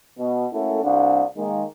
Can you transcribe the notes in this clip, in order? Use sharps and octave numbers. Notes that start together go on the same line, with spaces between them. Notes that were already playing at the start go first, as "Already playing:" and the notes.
B2
A3 A#3 C#4 E4 F#4 A4
C2 D4 F5 F#5
D#3 G#3 A#3 D#4